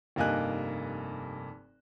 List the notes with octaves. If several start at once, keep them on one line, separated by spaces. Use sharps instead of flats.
F1 G2 A#3 D#4 G#5 F#6